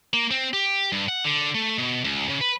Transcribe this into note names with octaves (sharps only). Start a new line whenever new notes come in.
A#3
C4
G4
G2
F#5
D3
A3
B2
C#2
C#3
B4